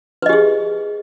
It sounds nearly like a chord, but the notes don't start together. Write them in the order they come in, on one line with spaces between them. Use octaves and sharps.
B4 D#5 G4 G#4